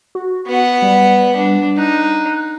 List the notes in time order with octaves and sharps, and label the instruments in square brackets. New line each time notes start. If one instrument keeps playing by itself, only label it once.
[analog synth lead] F#4
[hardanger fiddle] B3 F#5
[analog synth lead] G3
[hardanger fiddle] D4
[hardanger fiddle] D#4 [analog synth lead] F#6